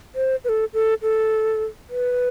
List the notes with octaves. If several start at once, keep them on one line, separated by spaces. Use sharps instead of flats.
C5
B4
A4
A4
A4
B4